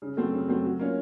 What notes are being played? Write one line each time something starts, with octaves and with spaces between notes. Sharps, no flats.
C#3
F#3 A3 C4
C#3
F#3 A3 C4
F#3
A#3 C#4 F4